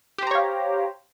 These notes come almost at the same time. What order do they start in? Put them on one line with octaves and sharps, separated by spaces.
G4 C5 A#5 C#5 F5